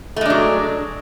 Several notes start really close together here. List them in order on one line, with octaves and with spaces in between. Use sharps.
A3 G#3 D4 F#3